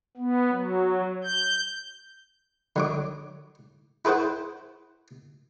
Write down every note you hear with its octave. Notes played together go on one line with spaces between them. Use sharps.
B3
F#3
G6
D3 F#3 D6
E4 G#4 B4 C5 F#5